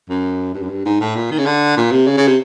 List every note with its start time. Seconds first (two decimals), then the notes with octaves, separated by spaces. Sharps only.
0.09 F#2
0.54 G2
0.63 F#2
0.69 G2
0.85 G#2
1.01 A2
1.16 A#2
1.31 D#3
1.38 C#3
1.46 D3
1.77 A#2
1.91 C3
2.07 C#3
2.17 C#3
2.28 C3